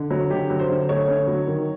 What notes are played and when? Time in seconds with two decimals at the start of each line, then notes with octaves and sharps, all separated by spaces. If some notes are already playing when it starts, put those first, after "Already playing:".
Already playing: D3
0.11 F#3
0.30 D3 G4
0.50 F#3
0.59 C5
0.69 D3
0.89 A3 C#5
1.08 D3
1.27 F#3
1.48 D#3